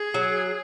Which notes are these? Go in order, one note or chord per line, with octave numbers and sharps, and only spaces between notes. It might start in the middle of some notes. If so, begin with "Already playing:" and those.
Already playing: G#4
F#3